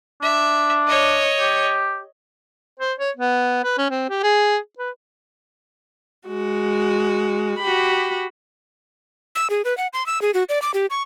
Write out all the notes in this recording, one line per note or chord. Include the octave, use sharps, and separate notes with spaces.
D4 E5
C#5 D#5
G4
C5
C#5
B3
B4
C#4
C4
G4
G#4
B4
G#3 F#4
F#4 G4 B5
E6
G#4
B4
F#5
C6
E6
G#4
F#4
D5
D6
G4
C#6